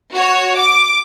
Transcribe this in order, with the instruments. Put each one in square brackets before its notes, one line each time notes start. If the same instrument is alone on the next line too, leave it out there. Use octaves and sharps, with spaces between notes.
[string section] F#4 C#5
D6